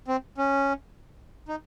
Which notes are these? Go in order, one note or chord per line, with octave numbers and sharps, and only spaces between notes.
C4
C#4
D#4